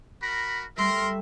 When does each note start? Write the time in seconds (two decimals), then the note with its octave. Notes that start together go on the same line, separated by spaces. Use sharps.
0.23 F#4 A#4 B5
0.77 G3 A3 A#4 E5 C6